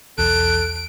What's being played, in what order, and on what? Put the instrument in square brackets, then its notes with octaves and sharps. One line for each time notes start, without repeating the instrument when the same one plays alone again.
[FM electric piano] B1 E2 [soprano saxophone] A4 [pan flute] F#6 [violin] D7